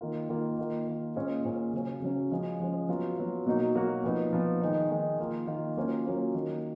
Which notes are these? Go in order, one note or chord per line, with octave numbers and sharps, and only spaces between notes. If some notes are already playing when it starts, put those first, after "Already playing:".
D#3 A#3 F4
D#3 A#3 F4
D#3 A#3 F4
D#3 A#3 F4
A#2 G#3 C#4 F4
A#2 G#3 C#4 F4
C#3 F#3 C#4
C#3 F#3 C#4
F3 G#3 C#4
F3 G#3 C#4
F#3 B3 F4
F#3 B3 F4
B2 F#3 A#3 D#4 F#4
B2 F#3 A#3 D#4 F#4
A#2 F3 B3 D#4
A#2 F3 B3 D#4
D#3 G#3 D#4
D#3 G#3 D#4
D#3 A#3 F4
D#3 A#3 F4
F#3 A#3 C#4 F4
F#3 A#3 C#4 F4
D#3 F#3 A#3